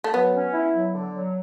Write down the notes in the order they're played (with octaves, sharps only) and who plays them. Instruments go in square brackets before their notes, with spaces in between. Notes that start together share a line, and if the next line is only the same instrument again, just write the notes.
[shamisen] A3
[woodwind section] F#3 [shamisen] B3
[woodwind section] C#4
E4
F#3
D3
F#3